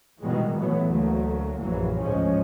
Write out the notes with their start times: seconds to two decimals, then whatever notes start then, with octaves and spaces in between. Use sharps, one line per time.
0.20 B2 D#3 E3 G3 G#3
0.56 B2 E3 F#3 A3 B3
0.85 D2 F#3 A3 A#3
1.60 A#1 F#2 E3 F#3 A#3
2.01 A1 D2 G#2 F3 G#3 C#4